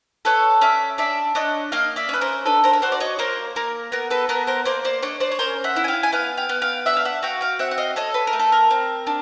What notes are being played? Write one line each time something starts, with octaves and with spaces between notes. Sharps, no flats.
A4 B4 C#5
C#4 D5 E5
D4 D5 E5
D4 C#5 D#5
A#3 D#5 F5
D5 E5
C#4 B4
A#4 C5
D4 A4 B4
A#4 C5
C#5
F#4 C5 D5
D5
C#5 D#5
A#3 A#4 C5
A#3 A#4
B3 A#4
A4 B4
B3 A#4
A#4 C5
A#3 C5 D5
C5 D5
D4 C#5 D#5
C5 D5
C#5
C#4 A#4 C5
E5 F#5
E4
G#5
F5 G5
G#5
B3 F5 G5
F5 G5
B3
F5 G5
D4 E5 F#5
F5
E5 F#5
F#4 F5 G5
F5 G5
C4 E5 F#5
F#5
D#5 F5
A4 C#5 D#5
B4
A#4
A3
A4
A#4
C4
D4